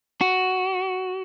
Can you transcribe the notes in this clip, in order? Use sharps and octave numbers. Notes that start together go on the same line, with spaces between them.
F#4